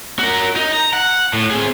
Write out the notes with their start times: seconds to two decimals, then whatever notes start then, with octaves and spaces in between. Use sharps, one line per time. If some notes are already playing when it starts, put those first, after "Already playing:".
0.19 F#4 A#4
0.56 D#4
0.72 A#5
0.93 F#5
1.33 A2
1.51 C4 G#4